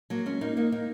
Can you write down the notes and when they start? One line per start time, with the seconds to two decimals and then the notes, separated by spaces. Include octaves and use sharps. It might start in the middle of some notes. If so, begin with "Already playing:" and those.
0.10 F#3 A#3
0.26 G#3 C#4
0.41 A#3 D#4
0.57 A#3 D#4
0.72 A#3 D#4